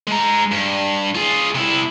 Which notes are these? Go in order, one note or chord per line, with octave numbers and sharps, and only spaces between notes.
G#3 A#5
G2
F4 G#4
C3 E4